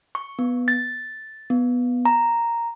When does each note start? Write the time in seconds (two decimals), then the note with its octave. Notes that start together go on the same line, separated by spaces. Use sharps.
0.15 C#6
0.39 B3
0.68 A6
1.50 B3
2.05 A#5